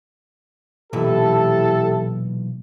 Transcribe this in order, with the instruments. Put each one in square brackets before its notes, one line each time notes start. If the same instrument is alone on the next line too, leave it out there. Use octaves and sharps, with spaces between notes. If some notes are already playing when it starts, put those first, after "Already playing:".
[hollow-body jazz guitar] B1 A#2 E3 [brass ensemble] E4 G4 A4